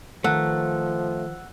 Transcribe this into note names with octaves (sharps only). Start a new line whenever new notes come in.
D#3 F3 A3 A#4 B4 F#5 E6 F#6